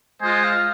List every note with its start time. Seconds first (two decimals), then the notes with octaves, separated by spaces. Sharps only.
0.21 G#3 F4 C5 D#5 G#5
0.44 F5